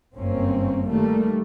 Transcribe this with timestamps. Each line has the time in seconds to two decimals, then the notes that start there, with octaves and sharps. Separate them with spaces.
0.16 G1 F#2 A#3 C4 C#4
0.88 D#3 G3 A3 A#3